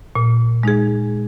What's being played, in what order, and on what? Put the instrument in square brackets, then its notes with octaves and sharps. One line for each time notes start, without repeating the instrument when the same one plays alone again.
[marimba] A#2
G#3 D#4 G#4